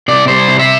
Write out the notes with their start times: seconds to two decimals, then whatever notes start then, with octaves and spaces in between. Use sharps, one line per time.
0.08 C3 D5
0.28 G3 C5
0.48 C3
0.59 E5